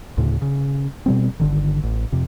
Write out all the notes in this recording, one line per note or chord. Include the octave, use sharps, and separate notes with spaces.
D2 A2 C#3
C#3
B2 G3 C4
G1 D3 D#3
A1
F2 C3